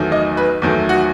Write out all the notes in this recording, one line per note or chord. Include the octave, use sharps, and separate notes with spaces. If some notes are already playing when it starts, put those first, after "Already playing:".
Already playing: E2 D#3 F#3 A3
D#5
B4
E2 D#3 F#3 A3
F#4